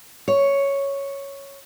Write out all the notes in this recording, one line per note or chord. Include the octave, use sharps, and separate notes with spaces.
C#5